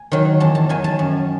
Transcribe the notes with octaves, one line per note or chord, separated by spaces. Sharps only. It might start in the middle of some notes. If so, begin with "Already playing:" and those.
Already playing: G#5
D#3 F#3
E2 A5
A5
D#3 F#3 G#5
A5
F#2